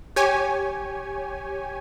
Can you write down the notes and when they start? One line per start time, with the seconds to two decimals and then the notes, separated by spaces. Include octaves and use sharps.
0.16 G4 C#5 G#5